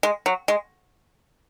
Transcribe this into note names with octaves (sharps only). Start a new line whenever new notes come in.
G#3
F#3
G#3